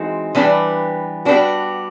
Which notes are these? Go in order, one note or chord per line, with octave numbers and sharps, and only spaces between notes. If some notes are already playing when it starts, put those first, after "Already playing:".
Already playing: E3 G#3 C4 D#4 F#4
E3 G3 B3 D4 G4
G3 B3 D4 F#4